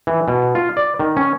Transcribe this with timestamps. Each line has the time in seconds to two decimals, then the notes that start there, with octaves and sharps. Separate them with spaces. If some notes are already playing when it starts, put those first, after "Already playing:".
0.07 E3
0.28 B2
0.55 F4
0.77 D5
0.99 D#3
1.17 C#4